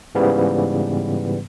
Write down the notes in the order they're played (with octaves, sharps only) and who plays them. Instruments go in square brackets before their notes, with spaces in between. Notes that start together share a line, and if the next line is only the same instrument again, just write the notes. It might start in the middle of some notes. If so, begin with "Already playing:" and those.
[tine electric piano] G#2 C#3 E3 G3 B3